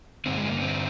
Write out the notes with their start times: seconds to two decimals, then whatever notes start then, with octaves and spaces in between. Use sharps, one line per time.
0.26 G2 D3 C4
0.37 G#3
0.49 A#3
0.61 C4